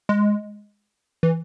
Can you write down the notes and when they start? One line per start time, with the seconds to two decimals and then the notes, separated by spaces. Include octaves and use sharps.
0.09 G#3
1.23 E3